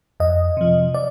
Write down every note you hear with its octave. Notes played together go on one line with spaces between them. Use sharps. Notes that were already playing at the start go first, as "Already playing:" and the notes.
F2 D#5
C3 F3
D5